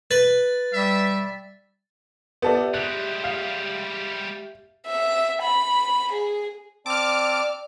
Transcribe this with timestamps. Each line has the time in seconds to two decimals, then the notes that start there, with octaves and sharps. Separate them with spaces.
0.11 B4 A6
0.73 G3 E5
2.42 B3 G4 A4 D5 E5
2.74 G3 G#3 F#6
3.24 F5
4.87 E5
5.42 B5
6.12 G#4
6.86 C4 D5 A5 D6 F6